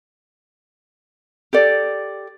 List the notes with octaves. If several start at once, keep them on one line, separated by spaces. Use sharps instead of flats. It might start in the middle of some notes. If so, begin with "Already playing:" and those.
G4 A4 D5